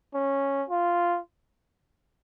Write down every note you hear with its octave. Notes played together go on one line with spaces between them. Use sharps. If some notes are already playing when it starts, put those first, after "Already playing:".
C#4
F4